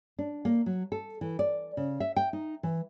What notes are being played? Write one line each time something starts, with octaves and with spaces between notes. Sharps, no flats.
D4
A#3
F#3
A4
E3
D5
C#3
E5
G5
D#4
E3